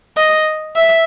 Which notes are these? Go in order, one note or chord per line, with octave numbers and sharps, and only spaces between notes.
D#5
E5